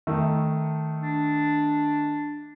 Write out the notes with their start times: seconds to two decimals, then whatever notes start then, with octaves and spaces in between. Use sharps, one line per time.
0.07 D#3 A3
1.01 D4